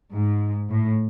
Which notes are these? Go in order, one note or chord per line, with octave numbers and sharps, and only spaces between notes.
G#2
A2